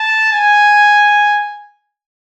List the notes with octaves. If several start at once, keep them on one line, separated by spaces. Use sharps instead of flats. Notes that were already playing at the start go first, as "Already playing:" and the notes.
Already playing: A5
G#5